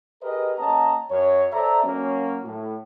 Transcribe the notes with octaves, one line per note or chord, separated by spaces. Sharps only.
G4 G#4 A#4 B4 D#5
A#3 C#4 D#5 F#5 A5 A#5
F#2 C#5
A4 C5 D5 E5 A#5
F#3 A#3 C#4
A2